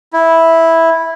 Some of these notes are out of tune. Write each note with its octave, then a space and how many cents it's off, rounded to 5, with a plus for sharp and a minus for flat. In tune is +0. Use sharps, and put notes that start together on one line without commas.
E4 -5